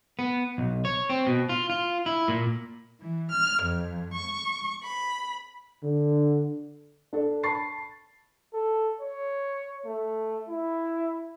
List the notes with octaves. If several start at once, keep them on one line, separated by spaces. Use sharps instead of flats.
B3
B1
C#5
C4
B2
F4
F4
E4
A#2
E3
F6
F2
C#6
B5
D3
D4 A4
A5 B5 C#6 A6 C7
A4
C#5
A3
E4